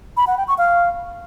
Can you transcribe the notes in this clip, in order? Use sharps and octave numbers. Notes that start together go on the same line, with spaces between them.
B5
F#5
G5
C#6
F5